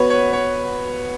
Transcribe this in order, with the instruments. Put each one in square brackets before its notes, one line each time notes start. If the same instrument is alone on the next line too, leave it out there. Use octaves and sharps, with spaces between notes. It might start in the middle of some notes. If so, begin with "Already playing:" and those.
Already playing: [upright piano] B3 F#4 [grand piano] B4 C#5
[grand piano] C#5
C#5